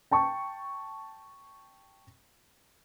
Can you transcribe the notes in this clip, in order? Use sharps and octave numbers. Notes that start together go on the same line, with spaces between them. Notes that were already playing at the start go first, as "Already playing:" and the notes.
G5 A5 C#6